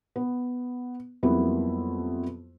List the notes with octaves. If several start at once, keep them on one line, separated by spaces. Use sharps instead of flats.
B3
F2 F#3 G3 A#3 B3 E4